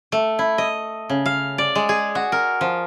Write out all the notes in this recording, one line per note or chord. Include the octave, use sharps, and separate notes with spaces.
A3
E4
D#5
C#3
F5
D5
G#3
G#4
F#4
A#4
F3